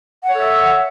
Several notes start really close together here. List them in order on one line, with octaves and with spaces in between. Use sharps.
F#5 C#5 A4 E5